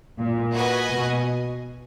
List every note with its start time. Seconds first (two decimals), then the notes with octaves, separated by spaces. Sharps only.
0.18 A#2
0.54 F#4 B4 D#5 G#5
0.90 B2